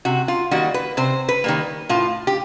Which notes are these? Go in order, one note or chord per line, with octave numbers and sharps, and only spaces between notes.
C3 F#4
F4
D#3 G3 A#3 F#4
B4
C3 C5
B4
D#3 G3 A#3
A2 F4
G4